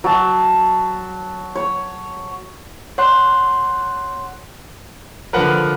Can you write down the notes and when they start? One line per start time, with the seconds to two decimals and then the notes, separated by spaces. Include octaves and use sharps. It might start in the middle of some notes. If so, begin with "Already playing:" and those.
0.04 F#3 A5
1.56 C#5
2.98 C#5 F#5 C6 F#6
5.33 D3 F3 A#4 B4 F#5